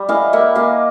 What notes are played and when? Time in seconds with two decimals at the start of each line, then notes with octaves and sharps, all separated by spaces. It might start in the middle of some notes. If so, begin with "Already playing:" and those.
Already playing: G3
0.09 E3 D#5 F5
0.33 A#3 E5 F#5
0.55 A#3 D#5 F5